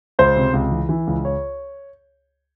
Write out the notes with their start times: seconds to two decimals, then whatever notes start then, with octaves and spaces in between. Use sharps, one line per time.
0.19 C#2 C5
0.36 C3
0.53 C#2
0.71 E3
0.89 E3
1.07 C#2
1.25 C#5